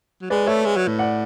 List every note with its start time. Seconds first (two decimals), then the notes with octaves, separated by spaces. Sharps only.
0.21 F#3
0.30 G#3 B4 D5
0.47 A3 C#5 E5
0.65 G#3
0.77 F#3
0.87 A2
0.99 D5 F#5